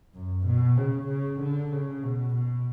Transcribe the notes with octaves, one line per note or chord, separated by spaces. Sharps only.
F#2
B2
C#3
C#3
D3
C#3
B2
B2